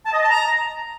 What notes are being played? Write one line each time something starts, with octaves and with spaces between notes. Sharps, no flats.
A5
D#5
A5
A#5